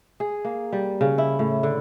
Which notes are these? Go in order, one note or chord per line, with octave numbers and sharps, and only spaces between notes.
G#4
A#3
G3
C#3
E4
A2
D3